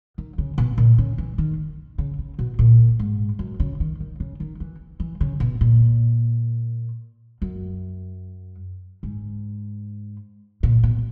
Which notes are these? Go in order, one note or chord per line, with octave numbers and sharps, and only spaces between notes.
D#3
C#3
B2
A#2
C#3
E3
D#3
C#3
C#3
B2
A#2
G#2
F#2
C#3
D#3
D#3
C#3
D#3
E3
E3
C#3
B2
A#2
F#2
G#2
A#2
B2